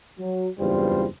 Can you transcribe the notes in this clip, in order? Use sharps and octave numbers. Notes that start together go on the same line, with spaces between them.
F#3
F#1 E2 G2 G3 F4 C5